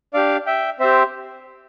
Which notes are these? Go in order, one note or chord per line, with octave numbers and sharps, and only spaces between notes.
D4 G4 D5 F5
E5 G5
C4 G4 C5 E5